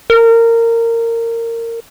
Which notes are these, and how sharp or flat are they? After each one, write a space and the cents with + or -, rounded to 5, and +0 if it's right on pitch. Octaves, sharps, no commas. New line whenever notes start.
A#4 -20